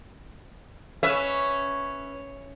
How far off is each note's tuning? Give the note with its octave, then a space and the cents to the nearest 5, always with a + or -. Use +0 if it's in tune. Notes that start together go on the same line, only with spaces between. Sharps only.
C#4 +0 B4 +0 E5 +0